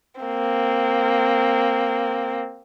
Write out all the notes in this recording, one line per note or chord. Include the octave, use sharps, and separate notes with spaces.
A#3 C4